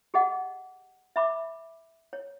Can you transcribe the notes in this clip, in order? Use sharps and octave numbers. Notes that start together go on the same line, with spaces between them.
G4 G#4 D#5 F#5
E5 B5 D6
C#5